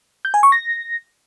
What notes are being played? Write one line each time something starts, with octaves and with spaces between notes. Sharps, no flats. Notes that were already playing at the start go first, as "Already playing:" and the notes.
G6
G#5
C#6
A#6